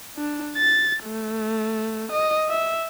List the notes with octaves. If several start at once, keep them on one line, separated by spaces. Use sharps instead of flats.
D4
A6
A3
D#5
E5